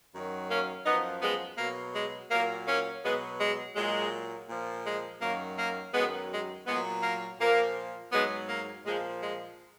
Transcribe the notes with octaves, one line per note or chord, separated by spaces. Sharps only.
F#2 D#3 F#3
A#3 C#4
F#2 F3 B3 D#4
G#3 B3
B2 F#3 A#3
G#3
A#2 F#3 A#3
A#3 C#4
B2 F#3 G#3 B3
G#3
A#2 F#3 G#3
A#2 F3
G#3
F#2 D#3 F#3 A#3
A#3
F#2 D#3 F#3 G#3 B3
G#3
A#2 F#3 G#3 B3
A#3
A#2 F3 A#3
G#2 F#3 G#3 B3
A#3
A#2 F3 G#3
G#3